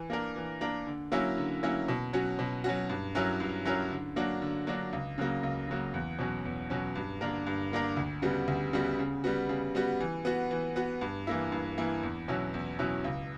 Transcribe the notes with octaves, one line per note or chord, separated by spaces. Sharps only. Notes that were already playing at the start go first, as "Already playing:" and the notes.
Already playing: E3
A#3 D4 A#4
E3
A#3 D4 A#4
D3
F#3 A#3 C#4 E4
D3
F#3 A#3 C#4 E4
B2
F#3 C#4 F#4
B2
F#3 C#4 F#4
G2
F#3 C#4 E4 A#4
G2
F#3 C#4 E4 A#4
D3
F#3 A#3 D4 F#4
D3
F#3 A#3 D4 F#4
C#2
C#3 F#3 A#3
C#2
C#3 F#3 A#3
E2
B2 F#3 C#4
E2
B2 F#3 C#4
G2
D3 A#3 D4 A#4
G2
D3 A#3 D4 A#4
D2
C#3 G3 B3 F#4
D2
C#3 G3 B3 F#4
C#3
G3 B3 F#4
C#3
G3 B3 F#4
E3
B3 F#4
E3
B3 F#4
G2
E3 A#3 E4
G2
E3 A#3 E4
E2
B2 F#3 C#4 E4
E2
B2 F#3 C#4 E4
C#2